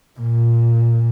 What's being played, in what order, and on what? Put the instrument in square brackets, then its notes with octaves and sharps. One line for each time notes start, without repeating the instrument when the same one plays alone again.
[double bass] A#2